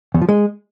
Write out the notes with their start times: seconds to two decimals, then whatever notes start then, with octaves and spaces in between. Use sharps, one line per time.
0.14 E2
0.22 F3
0.29 G#3